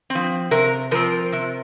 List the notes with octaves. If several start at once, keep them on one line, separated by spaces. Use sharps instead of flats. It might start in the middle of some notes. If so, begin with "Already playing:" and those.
C4
F3
C3 A#4
F3 C4 A#4
C3